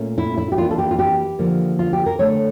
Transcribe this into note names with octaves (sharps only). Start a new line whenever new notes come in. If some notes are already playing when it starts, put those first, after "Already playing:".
Already playing: A#2 A3 C#4
E4
E4
G4
E3 A#3 D4 F4
A4
G4
F4
G4
D3 F3 A#3
F4
G4
A#4
D3 A3 D4 C#5